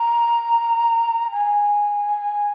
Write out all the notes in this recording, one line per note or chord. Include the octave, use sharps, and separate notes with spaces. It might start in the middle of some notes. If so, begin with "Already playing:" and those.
Already playing: A#5
G#5